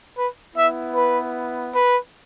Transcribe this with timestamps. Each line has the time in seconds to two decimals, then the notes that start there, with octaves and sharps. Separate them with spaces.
0.15 B4
0.54 B3 E4 E5
0.94 B4
1.72 B4